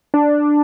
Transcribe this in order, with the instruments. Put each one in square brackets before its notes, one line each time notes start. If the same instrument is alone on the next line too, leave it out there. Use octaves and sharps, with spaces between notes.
[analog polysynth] D4